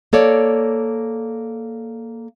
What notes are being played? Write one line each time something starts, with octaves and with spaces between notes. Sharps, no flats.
A#3 A4 C#5 D5